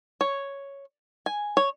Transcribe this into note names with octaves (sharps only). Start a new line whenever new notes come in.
C#5
G#5
C#5